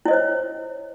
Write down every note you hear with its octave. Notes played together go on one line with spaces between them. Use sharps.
E4 C5 C#5 D#5